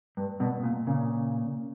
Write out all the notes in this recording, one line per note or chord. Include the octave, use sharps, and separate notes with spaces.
G2
G2 B2
A#2
A#2 C#3